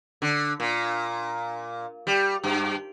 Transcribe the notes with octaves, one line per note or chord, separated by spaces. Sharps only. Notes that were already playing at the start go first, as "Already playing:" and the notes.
D3
A#2
G3
G2